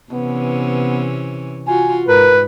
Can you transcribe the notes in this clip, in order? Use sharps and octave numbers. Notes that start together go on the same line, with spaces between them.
C3 E3 B3 C#4
F4 F#4 G#5
G#2 A#4 B4